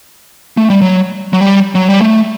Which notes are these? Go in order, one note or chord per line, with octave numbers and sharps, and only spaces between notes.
A3
G3
F#3
F#3
G3
F#3
G3
A3